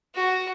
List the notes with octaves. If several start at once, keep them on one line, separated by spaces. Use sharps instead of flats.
F#4